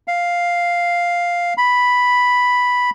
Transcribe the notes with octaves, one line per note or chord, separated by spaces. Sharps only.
F5
B5